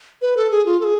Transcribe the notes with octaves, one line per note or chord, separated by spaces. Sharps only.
B4
A4
G#4
F4
A4
G#4